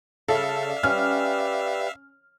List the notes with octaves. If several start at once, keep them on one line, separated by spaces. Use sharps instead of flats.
C#3 A4 E5 F5
D5
C#4 G4 B4 D5 F6